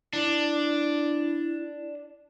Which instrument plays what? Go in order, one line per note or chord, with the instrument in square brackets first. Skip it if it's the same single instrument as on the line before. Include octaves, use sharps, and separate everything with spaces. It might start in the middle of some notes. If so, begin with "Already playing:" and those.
[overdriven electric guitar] D4 [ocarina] E4